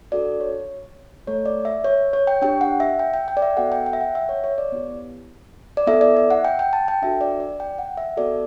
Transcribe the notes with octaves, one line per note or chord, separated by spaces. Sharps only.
D4 F#4 A4 D5
C#5
A3 E4 A4 C#5
D5
E5
C#5
C#5
G5
D4 G4 G5
F#5
E5
G5
G5
G5
D5
E5
B3 F#4 A4 F#5
G5
G5
E5
F#5
E5
C#5
C#5
D5
B3 E4 G4
D5
B3 E4 A4 E5
D5
E5
F#5
G5
G5
A5
G5
D4 F#4 A4 E5
D5
D5
G5
F#5
E5
B3 F#4 A4 D5